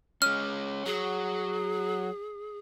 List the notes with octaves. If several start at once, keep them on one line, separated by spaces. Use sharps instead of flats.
G#3 C#4 F6
F#3 G#4